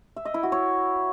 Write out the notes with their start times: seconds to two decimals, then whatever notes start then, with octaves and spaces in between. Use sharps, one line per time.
0.16 E5
0.25 D#5
0.34 E4
0.43 F#4
0.52 C#5